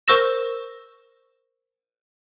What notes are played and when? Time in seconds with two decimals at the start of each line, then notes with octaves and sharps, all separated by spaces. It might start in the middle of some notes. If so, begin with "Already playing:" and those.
0.08 A#4 C5 C#6 E6 A#6 E7